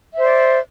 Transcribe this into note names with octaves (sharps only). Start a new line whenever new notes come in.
C5 D5 E5